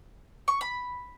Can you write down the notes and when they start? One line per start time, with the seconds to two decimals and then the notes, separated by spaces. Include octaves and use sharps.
0.48 C#6
0.61 B5